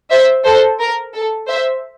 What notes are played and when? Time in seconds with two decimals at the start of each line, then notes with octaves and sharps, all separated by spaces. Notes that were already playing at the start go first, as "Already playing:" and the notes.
0.11 C5 E5
0.46 A4 C5
0.80 A#4
1.14 A4
1.48 C5 E5